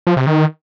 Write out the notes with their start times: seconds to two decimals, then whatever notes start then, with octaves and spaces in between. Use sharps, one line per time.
0.07 F3
0.17 C3
0.27 D#3